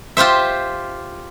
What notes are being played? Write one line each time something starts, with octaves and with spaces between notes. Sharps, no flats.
F4 G4 C5 E5